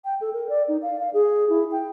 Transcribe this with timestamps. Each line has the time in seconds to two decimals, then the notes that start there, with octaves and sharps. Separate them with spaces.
0.05 G5
0.21 A4
0.33 A#4
0.49 D5
0.68 D#4
0.82 F5
1.00 F5
1.13 G#4
1.49 E4
1.72 G5